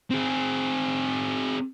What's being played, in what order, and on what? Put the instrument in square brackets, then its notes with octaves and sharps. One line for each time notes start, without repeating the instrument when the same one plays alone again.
[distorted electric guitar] C4 G#4